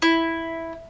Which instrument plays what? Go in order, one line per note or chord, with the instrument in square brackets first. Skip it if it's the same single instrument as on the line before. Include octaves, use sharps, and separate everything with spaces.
[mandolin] E4